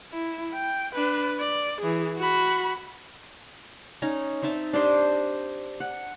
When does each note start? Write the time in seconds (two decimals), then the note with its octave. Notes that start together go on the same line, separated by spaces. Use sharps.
0.12 E4
0.54 G5
0.95 D4 B4
1.39 D5
1.81 E3 G#4
2.18 F#4 B5
4.02 C#4 D#4 A#5
4.42 C4 D#4 E5 A5
4.73 D4 G4 C5 D#5
5.80 F#5